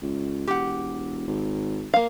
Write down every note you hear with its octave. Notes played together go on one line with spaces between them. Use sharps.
C#2
E1 G4 F#5
G#1
A#3 F5